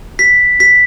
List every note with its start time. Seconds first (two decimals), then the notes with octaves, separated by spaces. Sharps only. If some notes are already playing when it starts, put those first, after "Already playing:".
0.19 B6
0.60 B6